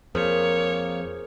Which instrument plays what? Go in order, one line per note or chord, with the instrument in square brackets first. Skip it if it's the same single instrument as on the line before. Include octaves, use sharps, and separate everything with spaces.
[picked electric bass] F2 [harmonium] A#3 [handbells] G#4 A#4 C5 [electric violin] C#5